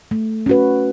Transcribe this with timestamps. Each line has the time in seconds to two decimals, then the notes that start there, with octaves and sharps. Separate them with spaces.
0.11 A3
0.46 C#4 F#4 B4